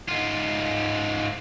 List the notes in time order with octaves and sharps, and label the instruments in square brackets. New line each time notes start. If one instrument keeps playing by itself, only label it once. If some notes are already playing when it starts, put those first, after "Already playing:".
[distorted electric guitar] G#2 F4